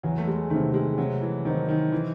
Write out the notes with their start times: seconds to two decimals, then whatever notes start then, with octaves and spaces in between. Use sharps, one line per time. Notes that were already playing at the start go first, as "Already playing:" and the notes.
0.03 E2 F#3
0.18 A3
0.27 G#3
0.50 C3 D#3 A3
0.74 G#3
0.98 C3 F#3
1.21 E3
1.45 D#3 F#3 C4 D#4
1.69 D#3
1.92 E3